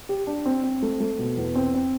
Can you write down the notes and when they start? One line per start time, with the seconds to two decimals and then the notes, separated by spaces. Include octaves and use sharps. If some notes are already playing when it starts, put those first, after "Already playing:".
0.09 G4
0.27 D4
0.46 C4
0.63 C4
0.82 A3
1.00 A3
1.19 B2
1.37 E2
1.55 C4
1.74 C4